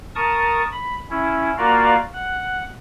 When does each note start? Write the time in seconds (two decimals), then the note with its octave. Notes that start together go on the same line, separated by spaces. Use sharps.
0.15 A#4 A5 C#6 D#6
0.72 B5
1.10 C#4 E4
1.58 A#3 F4 F#4 A#4 D5 F5
2.14 F#5